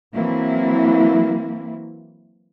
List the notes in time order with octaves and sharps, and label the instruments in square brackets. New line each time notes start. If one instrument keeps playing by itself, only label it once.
[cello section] E3 F#3 A#3 C4 E4